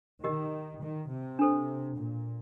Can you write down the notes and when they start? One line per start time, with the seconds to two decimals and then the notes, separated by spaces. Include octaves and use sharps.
0.24 D#3 G4 A#4 D#5
0.81 D#3
1.10 C3
1.39 D4 A4 C5
1.97 A#2